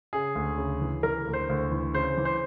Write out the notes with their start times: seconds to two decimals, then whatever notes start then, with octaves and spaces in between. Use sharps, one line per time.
0.13 C#3 G#4
0.35 D2
0.58 C#3
0.81 E3
1.03 E3 A#4
1.27 D2
1.33 C5
1.49 D2
1.72 E3
1.94 C#3 C5
2.18 E3
2.25 C5